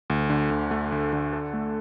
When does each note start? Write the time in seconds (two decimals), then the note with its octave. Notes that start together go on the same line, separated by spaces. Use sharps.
0.10 D2
0.30 D3
0.51 D2
0.71 A3
0.92 D2
1.13 D3
1.33 A4
1.54 A3